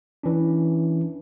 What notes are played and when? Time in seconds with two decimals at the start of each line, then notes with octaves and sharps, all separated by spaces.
0.23 E3 C#4 D4